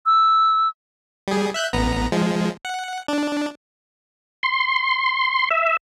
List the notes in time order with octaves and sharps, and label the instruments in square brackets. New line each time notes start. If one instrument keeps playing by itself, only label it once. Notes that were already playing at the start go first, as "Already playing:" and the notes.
[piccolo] E6
[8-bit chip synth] G3 G#4
E5 F#6 G6
A1 B3 A#5
F3 G#3
F#5
D4
[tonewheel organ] C6
E5